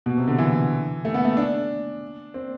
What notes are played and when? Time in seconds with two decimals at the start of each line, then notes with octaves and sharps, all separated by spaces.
0.06 B2
0.18 C3
0.28 D3
0.39 E3
1.05 A3
1.14 B3
1.25 A3
1.37 D4
2.34 C4